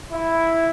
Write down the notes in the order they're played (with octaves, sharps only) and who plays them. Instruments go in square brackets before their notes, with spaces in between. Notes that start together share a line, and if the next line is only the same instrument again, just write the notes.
[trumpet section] E4